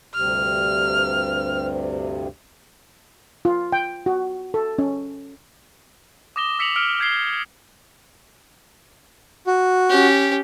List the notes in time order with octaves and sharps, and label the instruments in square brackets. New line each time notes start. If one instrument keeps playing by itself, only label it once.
[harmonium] D2 G2 C3 [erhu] F6
[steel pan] F4
G5
F#4
A4
C#4
[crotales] D6 D#6 A#6 E7 G7
E6 B6 C#7 F7 F#7
E6 F6 C#7 D7 G7
F6 G6 G#6 B6 C7 G7
[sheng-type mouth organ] F#4
[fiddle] C#4 G4